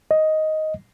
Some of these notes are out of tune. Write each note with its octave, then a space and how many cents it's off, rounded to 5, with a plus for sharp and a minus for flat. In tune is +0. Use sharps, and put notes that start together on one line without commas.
D#5 +5